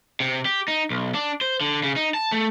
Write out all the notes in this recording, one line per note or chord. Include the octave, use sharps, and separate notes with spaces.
C3
G4
D#4
B1
D4
C5
D3
C#3
D#4
A5
A3